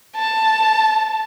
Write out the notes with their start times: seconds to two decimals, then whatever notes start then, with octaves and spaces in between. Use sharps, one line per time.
0.16 A5